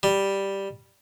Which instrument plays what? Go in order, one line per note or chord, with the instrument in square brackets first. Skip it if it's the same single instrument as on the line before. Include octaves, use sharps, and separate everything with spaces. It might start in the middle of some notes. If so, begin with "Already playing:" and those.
[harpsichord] G3